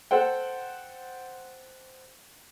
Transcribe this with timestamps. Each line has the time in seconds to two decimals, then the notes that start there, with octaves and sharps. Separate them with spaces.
0.11 A4 C5 F#5 G5